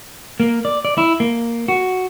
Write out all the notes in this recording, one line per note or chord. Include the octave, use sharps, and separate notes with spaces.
A#3
D5
D5
E4
A#3
F#4